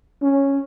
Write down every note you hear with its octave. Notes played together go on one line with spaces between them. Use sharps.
C#4